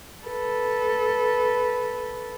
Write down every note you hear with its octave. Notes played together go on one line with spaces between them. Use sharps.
A4 B4